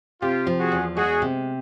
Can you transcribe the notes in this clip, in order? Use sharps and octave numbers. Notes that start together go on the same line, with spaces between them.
C3 F4 G4
F3
F#4 G#4
E2
G#3 F#4 G#4
C3